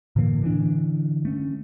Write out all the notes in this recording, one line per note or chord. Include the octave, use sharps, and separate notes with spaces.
A2 D3 E3 A#3
D3 E3 A#3 D4
A3 C#4